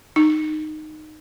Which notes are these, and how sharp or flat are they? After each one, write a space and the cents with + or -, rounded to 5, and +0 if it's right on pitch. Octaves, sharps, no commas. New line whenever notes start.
D#4 -10